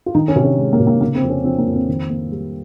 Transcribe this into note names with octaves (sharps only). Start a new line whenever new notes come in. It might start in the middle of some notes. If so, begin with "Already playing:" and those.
F4
D#3 D#4
C#4
C3
C#4
G#3
A#3
C3
A#3
C#3 A#3
C4
F2
C#4
F3 C4
A#3
F2
C4
D#3
A#3
G3